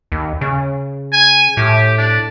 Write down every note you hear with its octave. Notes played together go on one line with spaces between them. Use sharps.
D#2
C#3
G#5
A2 G4
D4